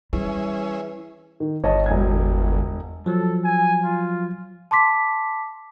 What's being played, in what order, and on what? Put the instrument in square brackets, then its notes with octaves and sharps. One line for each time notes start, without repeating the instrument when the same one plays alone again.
[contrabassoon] E3 [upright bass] G3 E4 [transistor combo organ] C#4 G#4 E5
[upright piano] D#3
[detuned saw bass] G1 [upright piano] C#5 D#5 A5
[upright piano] E1 G#5 G#6
[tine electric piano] F3 F#3 [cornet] A4
[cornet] G#5
F4
[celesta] A5 C6 D6 B6